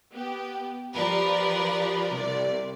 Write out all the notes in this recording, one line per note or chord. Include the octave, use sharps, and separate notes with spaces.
B3 G4
F3 G4 A#4 B4 D5
C2 C3 D5